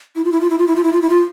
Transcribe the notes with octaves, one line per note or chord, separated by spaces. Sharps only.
E4
F4
E4
F4
E4
F4
E4
F4
E4
F4
E4
F4